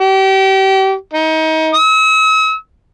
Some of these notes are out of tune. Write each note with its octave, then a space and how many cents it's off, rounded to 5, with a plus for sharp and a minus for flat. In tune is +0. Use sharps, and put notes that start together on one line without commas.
G4 -30
D#4 +30
E6 -45